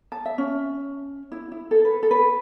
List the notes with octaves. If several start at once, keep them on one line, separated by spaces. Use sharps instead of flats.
A5
E5
C#4
E4
E4
A4
B4
A4
B4